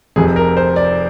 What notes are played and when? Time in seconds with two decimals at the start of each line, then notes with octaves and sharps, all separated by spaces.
0.16 F1 F2 C3 G#4
0.36 A#4
0.57 C5
0.76 D5